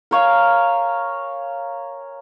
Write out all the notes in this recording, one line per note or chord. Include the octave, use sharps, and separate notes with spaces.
A#4 C#5 F5 G#5